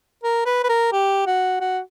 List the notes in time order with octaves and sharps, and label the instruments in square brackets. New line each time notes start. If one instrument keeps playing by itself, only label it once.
[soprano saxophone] A#4
B4
B4
A#4
G4
F#4
F#4